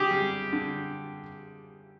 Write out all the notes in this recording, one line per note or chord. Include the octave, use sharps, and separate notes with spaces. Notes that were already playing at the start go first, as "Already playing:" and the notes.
Already playing: D3 G4 G#4
G3
D3